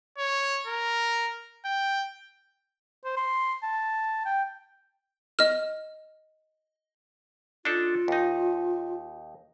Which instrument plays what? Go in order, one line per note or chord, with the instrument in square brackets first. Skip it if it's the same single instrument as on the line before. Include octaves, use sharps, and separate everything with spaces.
[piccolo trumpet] C#5
A#4
G5
[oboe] C5
C6
A5
G5
[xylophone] D#5 F6
[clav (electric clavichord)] D4 D#4 A4 [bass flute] F4
[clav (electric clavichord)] D#2 D#4